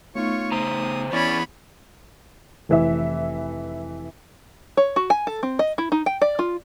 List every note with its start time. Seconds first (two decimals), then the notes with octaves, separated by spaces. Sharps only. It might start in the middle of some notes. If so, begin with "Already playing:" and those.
0.15 A3 B3 D#4 F4 C#5 C#6
0.52 C#3 C5 A#5 D#6
1.12 E3 B3 C#4 E4 C#5 D5 B5
2.69 F1 E3 E5
4.77 C#5
4.96 F#4
5.10 G#5
5.27 A4
5.43 C4
5.59 D#5
5.78 E4
5.92 D#4
6.06 G5
6.22 D5
6.39 F4